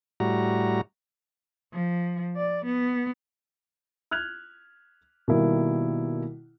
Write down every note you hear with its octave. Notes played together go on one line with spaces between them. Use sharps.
A2 G3 F#4 A#5
F3
D5
B3
F6 F#6 G#6 F7
B2 D#3 G3 A#3 E4